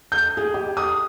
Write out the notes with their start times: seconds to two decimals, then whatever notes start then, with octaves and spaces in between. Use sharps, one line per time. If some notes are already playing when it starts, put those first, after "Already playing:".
0.12 G6
0.37 G#4
0.54 G4
0.77 D#6